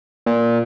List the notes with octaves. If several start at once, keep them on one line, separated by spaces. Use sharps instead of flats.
A#2